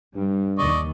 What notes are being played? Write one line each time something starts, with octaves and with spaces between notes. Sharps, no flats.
G2 G3
D#2 D#3 D5 D#5 C#6